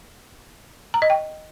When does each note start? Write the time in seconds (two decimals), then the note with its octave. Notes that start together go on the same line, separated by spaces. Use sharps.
0.94 A#5
1.02 D#5
1.10 G5